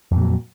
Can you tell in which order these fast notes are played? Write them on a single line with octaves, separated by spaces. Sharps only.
F2 A#2 F#3